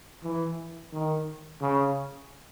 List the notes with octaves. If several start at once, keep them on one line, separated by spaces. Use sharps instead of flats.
E3
D#3
C#3